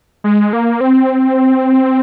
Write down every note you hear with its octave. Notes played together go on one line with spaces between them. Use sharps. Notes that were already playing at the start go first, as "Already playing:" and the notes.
G#3
A#3
C4